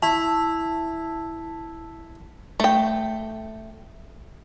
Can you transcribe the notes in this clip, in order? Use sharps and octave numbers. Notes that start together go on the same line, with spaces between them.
E4 A5
A3 G5